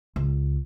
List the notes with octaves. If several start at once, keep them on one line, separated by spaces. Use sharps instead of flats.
C#2